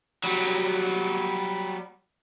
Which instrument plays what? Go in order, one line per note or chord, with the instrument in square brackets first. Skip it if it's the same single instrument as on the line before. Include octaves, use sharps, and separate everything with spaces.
[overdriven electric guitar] F#3 G3